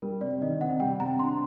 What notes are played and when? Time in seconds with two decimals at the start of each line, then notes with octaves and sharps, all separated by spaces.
0.02 G3 A#4
0.21 C3 D5
0.41 D#3 D#5
0.61 C3 F#5
0.80 G3 G5
1.00 C3 A#5
1.19 D4 C6